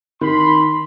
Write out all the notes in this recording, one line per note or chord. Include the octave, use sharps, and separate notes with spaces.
D#3 B5 C6